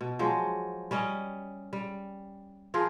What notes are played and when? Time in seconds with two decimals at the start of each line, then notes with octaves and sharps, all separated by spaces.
0.01 B2
0.19 F3 F#3 G#3
0.91 G3 C#4 D#5
1.73 G3
2.74 F3 F4 G#4 A#4